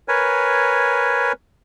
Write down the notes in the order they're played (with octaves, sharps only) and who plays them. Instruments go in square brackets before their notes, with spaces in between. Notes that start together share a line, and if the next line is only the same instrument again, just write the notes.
[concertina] A#4 B4 C#5 G#5